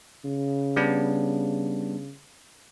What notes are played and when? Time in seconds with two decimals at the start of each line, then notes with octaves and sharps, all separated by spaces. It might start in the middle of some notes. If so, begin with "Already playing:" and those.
0.25 C#3
0.76 G3 B3 D4